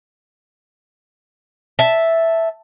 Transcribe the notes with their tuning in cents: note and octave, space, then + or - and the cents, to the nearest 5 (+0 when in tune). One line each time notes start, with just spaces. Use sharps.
E5 +0 A5 +0